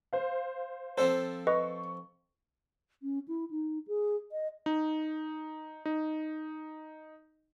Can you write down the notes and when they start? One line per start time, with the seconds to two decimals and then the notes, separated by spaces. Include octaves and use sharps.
0.13 C5 F5
0.98 F3 C4 A4 C5
1.47 B4 D#5 C#6
3.03 C#4
3.28 E4
3.51 D#4
3.88 G#4
4.32 D#5
4.66 D#4
5.85 D#4